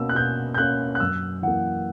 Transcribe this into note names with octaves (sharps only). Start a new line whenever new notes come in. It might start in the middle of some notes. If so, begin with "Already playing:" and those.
Already playing: B2 A#3 C#4 E6
F#6
B2 G6
G6
A#3 C#4 F#6
F#6
F#2 E6
E3 A#3 F#5